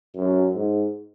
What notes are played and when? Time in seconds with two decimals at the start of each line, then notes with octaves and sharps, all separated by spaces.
0.16 F#2
0.55 G#2